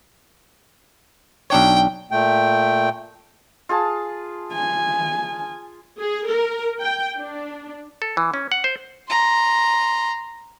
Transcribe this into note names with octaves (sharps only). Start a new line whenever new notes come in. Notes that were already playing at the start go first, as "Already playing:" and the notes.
B1 D4 C#5 G5
A#2 A3 G5
F4 G#4 A5
G#5
G#4
A#4
G5
D4
A4
E3
C#4
F#5
C5
A#5 C6